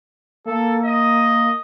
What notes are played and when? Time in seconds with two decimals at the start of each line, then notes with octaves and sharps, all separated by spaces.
0.47 A#3 A4
0.85 D#5